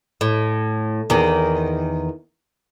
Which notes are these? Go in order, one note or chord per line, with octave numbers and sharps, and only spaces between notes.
A2
E2 D#3